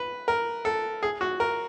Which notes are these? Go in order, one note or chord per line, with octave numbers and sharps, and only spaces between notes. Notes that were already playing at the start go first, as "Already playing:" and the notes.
Already playing: B4
A#4
A4
G#4
F#4
A#4